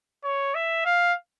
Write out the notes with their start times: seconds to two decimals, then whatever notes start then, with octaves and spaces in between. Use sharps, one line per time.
0.24 C#5
0.54 E5
0.85 F5